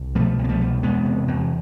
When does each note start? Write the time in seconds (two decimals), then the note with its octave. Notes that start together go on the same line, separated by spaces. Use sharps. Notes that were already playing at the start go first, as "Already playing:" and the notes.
Already playing: C2
0.15 B2 F3 A3
0.39 C2
0.44 B3
0.49 F3 A3
0.61 B2
0.83 E2 G#3 B3
1.05 C3
1.28 E2